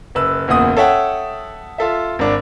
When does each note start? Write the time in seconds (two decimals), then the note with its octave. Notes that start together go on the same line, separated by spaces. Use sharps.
0.15 F#1 B4 E6
0.48 F#1 E2 A#2 F#5 D#6
0.77 A4 C#5 E5 F#5 G5
1.78 F4 A4 E5
2.19 G#1 D4